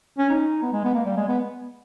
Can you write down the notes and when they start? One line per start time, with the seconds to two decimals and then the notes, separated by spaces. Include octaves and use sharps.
0.18 C#4
0.30 D#4
0.62 B3
0.73 G#3
0.84 B3
0.95 A#3
1.05 G3
1.17 G#3
1.28 B3